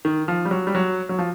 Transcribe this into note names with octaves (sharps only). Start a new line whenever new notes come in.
D#3
F3
G3
F#3
G3
F#3
F#3
F3